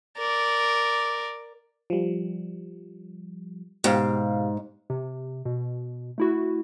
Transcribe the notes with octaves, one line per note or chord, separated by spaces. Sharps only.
A#4 D5
F3 G3
G#2 B2 G4 F5
C3
B2
A3 E4 F#4